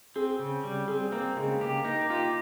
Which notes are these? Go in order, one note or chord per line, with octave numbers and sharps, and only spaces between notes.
C4 G#4
C#3
G3
C4 G#4
A#3 C4
C#3 G#3
A#3 G4
A#3 D#4
F4 G4